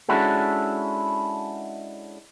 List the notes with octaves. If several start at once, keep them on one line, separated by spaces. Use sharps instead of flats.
G#3 C#4 D4 E4 F#4 A4